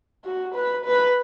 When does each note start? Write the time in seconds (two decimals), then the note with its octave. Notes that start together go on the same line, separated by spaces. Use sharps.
0.25 F#4
0.54 B4
0.85 B4